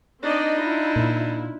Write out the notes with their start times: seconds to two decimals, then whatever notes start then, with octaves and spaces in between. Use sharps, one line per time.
0.23 C4 D4 D#4 D5 D#5
0.57 E4 F4
0.96 A#2